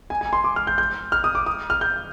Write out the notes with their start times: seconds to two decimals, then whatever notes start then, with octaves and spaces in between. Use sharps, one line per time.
0.10 G#5
0.21 G#5
0.33 C6
0.44 D6
0.56 F6
0.67 G6
0.78 G6
1.12 F6
1.24 D#6
1.35 D6
1.46 D#6
1.70 F6
1.81 G6